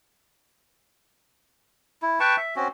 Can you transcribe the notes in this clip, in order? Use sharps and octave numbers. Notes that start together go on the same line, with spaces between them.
E4
B4 G5 A5 C#6
E5
C4 C#4 F#4